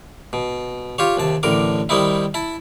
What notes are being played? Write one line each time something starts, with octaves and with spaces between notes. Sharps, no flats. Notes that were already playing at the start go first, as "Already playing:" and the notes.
B2
F4 G4 C#5
D#2 C3 A5
A1 A2 D3 A#4 D6
D#3 G3 C4 D#4 E4
E4 A5